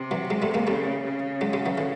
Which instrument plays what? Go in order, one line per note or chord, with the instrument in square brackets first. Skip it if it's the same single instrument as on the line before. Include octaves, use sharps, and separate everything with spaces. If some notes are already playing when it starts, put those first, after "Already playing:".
Already playing: [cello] C3
[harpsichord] E3 F#3
F#3 G#3
G3 A3
G#3 A#3
[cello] C#3 [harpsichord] G3 A3
[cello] C#3
[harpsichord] F#3 G#3
F#3 G#3
E3 F#3
D3 E3